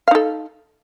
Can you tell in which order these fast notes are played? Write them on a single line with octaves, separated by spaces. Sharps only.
F5 D#4 A4